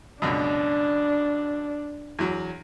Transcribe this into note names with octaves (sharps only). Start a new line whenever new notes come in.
C#2 F#2 B2 D4
E2 F#3